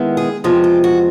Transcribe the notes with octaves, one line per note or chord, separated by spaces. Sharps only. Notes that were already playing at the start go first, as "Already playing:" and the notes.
Already playing: D#3 G#3 B3 E4
G#4
E2 C3 F3 G#3 G4
G4
F#4